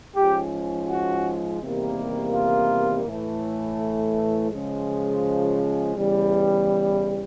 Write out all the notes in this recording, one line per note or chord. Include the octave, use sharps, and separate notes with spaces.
G#2 F3 G#3 C#4 G4
F#4
E2 C3 D#3 G3 A#3
F4
A2 E3 A3
C#3 F3 G#3
E2 C#3 E3 G3